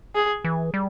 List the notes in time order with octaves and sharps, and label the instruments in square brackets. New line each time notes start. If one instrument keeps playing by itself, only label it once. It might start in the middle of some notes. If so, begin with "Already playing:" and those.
[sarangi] G#4
[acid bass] E3
G3